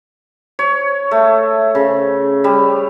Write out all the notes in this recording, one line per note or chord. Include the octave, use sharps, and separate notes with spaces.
C#5
A3
C#3
G3